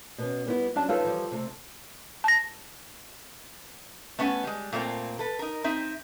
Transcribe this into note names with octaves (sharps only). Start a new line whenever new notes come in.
B2 B3 C#4
G3 B3 E4
F#3 C#4 D4 A5
D#4 F4 A4 B4 C#5
E3 F3 G3
C3 A3
A5 A#6
A3 B3 C#4 F#5 G#5
G3 G#3
A#2 A3 A#3 C4
A4 B4
D#4 A#4
C4 D#4 E5